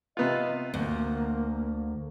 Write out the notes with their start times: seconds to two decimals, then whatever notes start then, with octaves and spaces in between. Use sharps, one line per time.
0.17 C3 B3 F4 D#5
0.74 D2 A#3